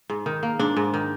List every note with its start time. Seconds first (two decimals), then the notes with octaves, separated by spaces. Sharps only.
0.10 G#2
0.26 D#3
0.43 A#3
0.59 G#2 D4
0.77 G#2
0.94 D#3